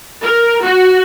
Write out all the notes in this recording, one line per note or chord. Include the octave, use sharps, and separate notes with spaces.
A#4
F#4